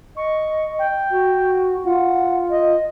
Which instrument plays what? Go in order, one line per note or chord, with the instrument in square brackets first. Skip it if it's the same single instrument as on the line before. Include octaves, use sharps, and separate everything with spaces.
[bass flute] D#5 [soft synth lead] C#6
[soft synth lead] G5
[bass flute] F#4
[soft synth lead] F4 [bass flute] F#5
[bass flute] D#5